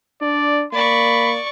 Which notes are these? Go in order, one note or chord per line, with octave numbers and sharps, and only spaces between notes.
D4 D5
A#3 D5 B5 C#6